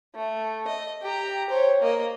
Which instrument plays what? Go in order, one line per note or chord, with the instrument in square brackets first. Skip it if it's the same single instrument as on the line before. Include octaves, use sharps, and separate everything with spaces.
[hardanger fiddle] A3
D#5
G4 A#5
C5 C#5
A#3 D#5